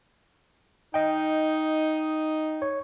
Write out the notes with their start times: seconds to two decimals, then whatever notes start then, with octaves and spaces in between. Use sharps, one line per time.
0.94 D#4 D#5 G5
2.62 C#5